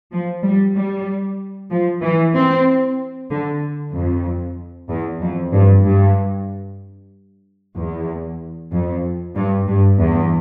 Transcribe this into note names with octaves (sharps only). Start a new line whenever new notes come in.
F3
G3
G3
F3
E3
C4
D3
F2
E2
F2
G2
G2
E2
F2
G2
G2
E2